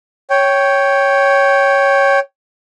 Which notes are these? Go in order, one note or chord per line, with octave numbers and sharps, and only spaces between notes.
C#5 G5